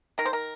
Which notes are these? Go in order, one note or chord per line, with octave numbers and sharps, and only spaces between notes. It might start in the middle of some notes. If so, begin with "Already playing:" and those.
D#3 A#4
C5
A#4